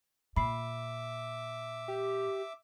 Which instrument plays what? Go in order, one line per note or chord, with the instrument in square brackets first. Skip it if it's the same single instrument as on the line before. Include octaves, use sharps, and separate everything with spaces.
[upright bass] A#2 [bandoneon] E5 D6 [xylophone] B5 C7
[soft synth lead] G4